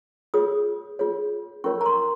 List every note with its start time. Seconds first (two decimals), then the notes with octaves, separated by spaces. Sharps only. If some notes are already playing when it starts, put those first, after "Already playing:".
0.34 F4 G#4 C#5 D#6
0.99 F4 G#4 C#5
1.64 C#4 F4 A#4 C#5 C#6
1.81 A#5
1.86 C6